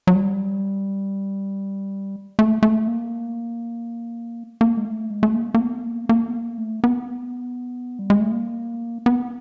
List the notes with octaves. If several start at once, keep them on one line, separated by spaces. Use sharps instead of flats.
F#3
G3
A3
A3
A#3
A#3
G#3
A3
G#3
A3
A#3
A#3
B3
A#3
A#3
B3
A#3
A3
B3
G3
G#3
A3
A#3
B3